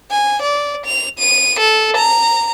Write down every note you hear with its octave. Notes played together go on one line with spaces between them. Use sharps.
G#5
D5
F7
D#7
A4
A#5